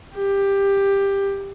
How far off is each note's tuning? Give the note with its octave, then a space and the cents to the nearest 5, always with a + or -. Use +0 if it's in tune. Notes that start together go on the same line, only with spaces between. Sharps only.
G4 +15